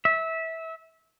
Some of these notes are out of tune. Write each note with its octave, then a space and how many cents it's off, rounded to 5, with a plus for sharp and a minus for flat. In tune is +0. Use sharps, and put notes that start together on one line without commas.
E5 -20